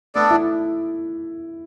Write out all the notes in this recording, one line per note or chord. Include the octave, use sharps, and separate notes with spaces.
A3 B3 D4 A4 D5
E4